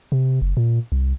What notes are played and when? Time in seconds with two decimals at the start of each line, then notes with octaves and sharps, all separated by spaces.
0.12 C3
0.42 F#1
0.57 A#2
0.92 C2